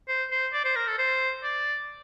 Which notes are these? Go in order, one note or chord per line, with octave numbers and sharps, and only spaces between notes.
C5
C5
D5
C5
A#4
A4
C5
D5